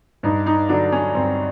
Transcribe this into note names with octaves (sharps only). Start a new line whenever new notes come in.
G2 D#4
D#4
D3 F#3 D4
C#4
G2 C4